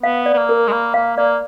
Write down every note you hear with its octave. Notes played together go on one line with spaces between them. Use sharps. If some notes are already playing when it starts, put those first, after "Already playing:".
B3 F5
D5
B3
A#3
A#4
G#3
A#3 B5
A#3 F5
A#3 D5